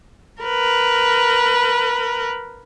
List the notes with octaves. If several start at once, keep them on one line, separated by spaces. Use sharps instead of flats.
A#4 B4